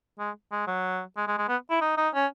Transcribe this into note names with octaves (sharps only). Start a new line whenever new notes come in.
G#3
G#3
F#3
G#3
G#3
G#3
B3
E4
D#4
D#4
C#4